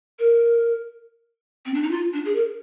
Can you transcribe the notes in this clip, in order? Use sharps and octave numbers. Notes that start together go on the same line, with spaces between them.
A#4
C4
D4
D#4
F4
D4
G#4
A#4